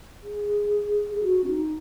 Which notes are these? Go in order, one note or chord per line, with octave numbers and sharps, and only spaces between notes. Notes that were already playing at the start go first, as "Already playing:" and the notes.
G#4
G#4
F#4
C#4
D#4